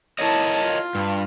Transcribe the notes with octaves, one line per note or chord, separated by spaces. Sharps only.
E4 A#4 C#5 D#5 A5
F4
G2